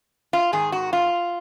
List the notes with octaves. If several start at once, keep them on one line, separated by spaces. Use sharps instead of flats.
F4
G#2 D#3 G#4
F#4
F4